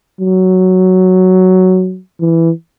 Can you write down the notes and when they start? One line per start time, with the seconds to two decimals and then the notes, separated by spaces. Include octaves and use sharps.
0.21 F#3
2.21 E3